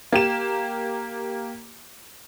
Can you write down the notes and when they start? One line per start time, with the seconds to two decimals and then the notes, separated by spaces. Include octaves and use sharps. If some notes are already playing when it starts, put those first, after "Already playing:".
0.12 A#3 G4 E7